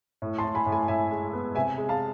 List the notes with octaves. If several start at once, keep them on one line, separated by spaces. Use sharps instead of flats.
A2
A5 C6
A2
G#5 B5
A2
G#5 B5
A2 E5 G#5
G#3
B3
C3 E5 G#5
G#3
F5 A5